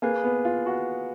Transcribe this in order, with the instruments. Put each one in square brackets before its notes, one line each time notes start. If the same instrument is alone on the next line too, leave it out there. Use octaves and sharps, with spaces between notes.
[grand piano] A#3 [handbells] G#4 B4 F5 G#5
[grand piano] B3
F4
F#4